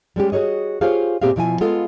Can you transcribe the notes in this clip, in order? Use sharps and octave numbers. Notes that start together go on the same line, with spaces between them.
G3 G#3 C#4 G4
F#4 G#4 B4 C#5 D#5
F4 G4 G#4 C5 C#5 F5
A#2 C4 G4 G#4 E5 F5
B2 F3 E4 G#5
G#3 B3 F4 A4 F5